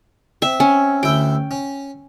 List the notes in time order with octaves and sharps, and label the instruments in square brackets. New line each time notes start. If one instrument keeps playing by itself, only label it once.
[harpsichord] C4 [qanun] E5
[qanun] C#4
[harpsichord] D2 E4 [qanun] G5
[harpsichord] C#4